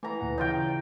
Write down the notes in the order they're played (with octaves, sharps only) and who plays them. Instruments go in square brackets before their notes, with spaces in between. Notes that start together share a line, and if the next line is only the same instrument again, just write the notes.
[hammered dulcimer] E3 A#5 [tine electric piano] A3
[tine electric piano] D2 A#2 F#5
[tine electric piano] C#3 E3 C#5 [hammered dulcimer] D#4 F4 G5